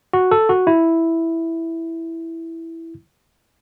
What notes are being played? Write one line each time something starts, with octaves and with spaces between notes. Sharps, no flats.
F#4
A4
F#4
E4